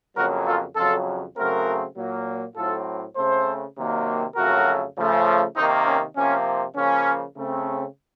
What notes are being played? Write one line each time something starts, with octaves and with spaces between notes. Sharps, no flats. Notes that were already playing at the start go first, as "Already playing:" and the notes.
F2 C#3 F#3 A#3 F#4 A#4
F4 A4
F2 C#3 F#3 F4 A4
C#3 F#3 A3 C4 F#4 A#4
A#2 F#3 A#3
A2 F#3 C4 F4 A4
C#3 A3 C4 A4 C5
C3 D#3 F#3 A#3
F2 C#3 F#3 A3 F#4 A#4
C#3 F3 A3
C3 D#3 A#3 C4 D#4
C#4
C3 F3 A#3 C#4
C#3 F3 A#3 C#4
C#3 A3 C4